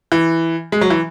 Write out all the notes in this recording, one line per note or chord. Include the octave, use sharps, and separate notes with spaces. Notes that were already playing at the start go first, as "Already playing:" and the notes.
E3
G#3
F#3
E3